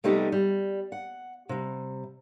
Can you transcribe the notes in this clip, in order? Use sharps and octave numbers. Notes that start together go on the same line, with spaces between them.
C3 G3 A3 B3 D#4 G4
G3
F#5
C3 G3